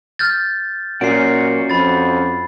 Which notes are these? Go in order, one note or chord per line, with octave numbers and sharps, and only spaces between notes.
F6 G6 A6
A#2 C#4 F#4 C7 D7
F2 B5 A6